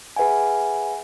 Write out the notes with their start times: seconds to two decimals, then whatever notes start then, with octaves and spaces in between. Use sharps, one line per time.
0.16 G#4 B4 E5 F#5 G#5